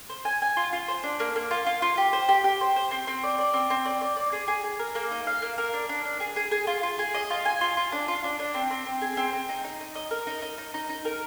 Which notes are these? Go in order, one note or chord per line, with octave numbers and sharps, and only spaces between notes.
C5
G#5
G#5
F4
F4
C5
D4
A#3
A#3
F4
F4
F4
G4
C5
G4
G4
C5
C5
C4
C4
D5
D5
C4
C4
D5
D5
D5
G#4
G#4
G#4
A#4
A#3
D#4
F5
A#3
A#4
D4
D4
D4
G#4
G#4
G#4
F4
F4
G#4
D#5
F4
G#5
F4
F4
D4
F4
D4
D4
C4
C4
C4
G#4
C4
C4
D#4
D#4
D#5
D#5
A#4
D#4
D#4
D#4
D#4
D#4
A#4